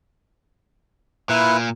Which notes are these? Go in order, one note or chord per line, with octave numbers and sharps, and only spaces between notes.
A#2 E4 B4